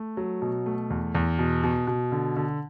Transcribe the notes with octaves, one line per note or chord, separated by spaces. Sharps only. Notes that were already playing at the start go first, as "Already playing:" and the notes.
Already playing: A3
F#3
B2
A3
E2
E2
B2
B2
B2
D3
D3